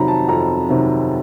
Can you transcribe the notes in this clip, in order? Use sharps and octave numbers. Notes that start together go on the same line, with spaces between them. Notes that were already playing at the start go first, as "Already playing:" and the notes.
Already playing: F2 C3 D#3 F#3 A#5 B5
A5
F2 A#5
C3 D#3 F#3